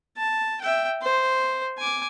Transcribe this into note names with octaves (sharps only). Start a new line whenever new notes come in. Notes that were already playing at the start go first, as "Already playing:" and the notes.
A5
E5 G5
C5
G#5 D6